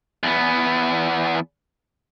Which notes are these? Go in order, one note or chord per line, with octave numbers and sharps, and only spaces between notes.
E2 B3